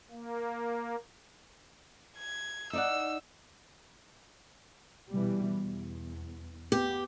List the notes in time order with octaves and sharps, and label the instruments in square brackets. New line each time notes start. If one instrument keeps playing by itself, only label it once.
[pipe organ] A#3
[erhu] G#6
[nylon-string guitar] D#4 D5 F#5 [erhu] E6
[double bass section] B2 E3 G3
E2
[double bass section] B3 [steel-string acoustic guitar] G4